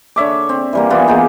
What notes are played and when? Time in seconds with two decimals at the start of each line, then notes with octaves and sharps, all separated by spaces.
0.16 D3 C#5 E5 D6
0.49 C4
0.73 E3 G3 A#3
0.90 E3 A#3 B3 F4
1.08 B3 D#4 F4 G#4